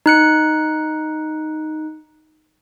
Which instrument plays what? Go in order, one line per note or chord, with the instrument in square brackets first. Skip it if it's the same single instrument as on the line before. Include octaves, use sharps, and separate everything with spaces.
[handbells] D#4 F#6 C#7